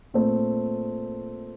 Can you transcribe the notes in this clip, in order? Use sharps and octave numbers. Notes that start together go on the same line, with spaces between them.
A#2 A3 C4